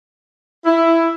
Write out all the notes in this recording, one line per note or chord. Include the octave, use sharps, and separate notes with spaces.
E4